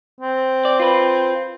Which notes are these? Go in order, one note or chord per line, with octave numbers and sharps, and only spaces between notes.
C4
D5
F4 B4